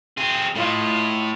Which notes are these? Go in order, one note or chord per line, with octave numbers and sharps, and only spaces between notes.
C4 G#4
A2 A3 F4 D#5